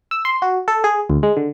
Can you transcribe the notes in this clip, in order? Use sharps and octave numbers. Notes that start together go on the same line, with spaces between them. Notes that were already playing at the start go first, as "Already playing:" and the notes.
E6
C6
F#4
A4
G#4
D2
G#3
D3